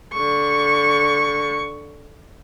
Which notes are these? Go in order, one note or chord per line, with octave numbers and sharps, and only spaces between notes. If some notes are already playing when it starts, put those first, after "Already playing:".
D3 C#6